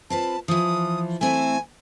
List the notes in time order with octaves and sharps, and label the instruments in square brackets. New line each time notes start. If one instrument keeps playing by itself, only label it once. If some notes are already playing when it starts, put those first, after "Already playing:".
[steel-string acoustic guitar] C4 F4 B4 [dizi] A5
[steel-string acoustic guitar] E3 F3 [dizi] D#6
[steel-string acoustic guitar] A3 C4 E4 [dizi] G#5